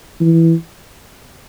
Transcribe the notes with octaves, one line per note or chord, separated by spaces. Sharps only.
E3